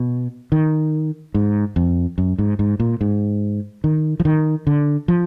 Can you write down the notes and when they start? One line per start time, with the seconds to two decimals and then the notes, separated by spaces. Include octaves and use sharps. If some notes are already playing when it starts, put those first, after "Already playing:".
Already playing: B2
0.52 D#3
1.34 G#2
1.76 F2
2.18 F#2
2.38 G#2
2.59 G#2
2.80 A#2
3.01 G#2
3.84 D#3
4.20 F3
4.25 D#3
4.67 D3
5.08 F3